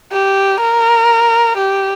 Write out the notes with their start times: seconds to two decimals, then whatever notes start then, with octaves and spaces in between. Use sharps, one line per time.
0.12 G4
0.60 A#4
1.58 G4